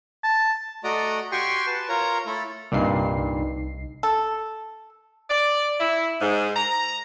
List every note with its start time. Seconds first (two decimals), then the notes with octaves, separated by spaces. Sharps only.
0.23 A5
0.84 A3 F#4 D5 D#5 A#5
1.32 F#4 G4 G5 G#5 C6 C#6
1.67 B4 A5
1.89 F4 A#4 C#5 A#5
2.26 A3 E4 A4
2.72 C2 G2 A#2 D#4 C7
4.03 A4
5.30 D5
5.80 E4
6.21 G#2
6.56 A#5